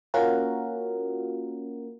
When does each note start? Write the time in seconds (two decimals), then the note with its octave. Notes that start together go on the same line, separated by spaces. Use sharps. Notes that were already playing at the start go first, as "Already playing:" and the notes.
0.14 A#3 C#4 F4 F#4 A#4